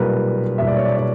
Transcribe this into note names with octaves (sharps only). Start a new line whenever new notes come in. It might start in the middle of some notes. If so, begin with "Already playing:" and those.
Already playing: B1 A#2 G3 A#4 B4
B1 A#2 G3 E5
D5
C#5
D5
D5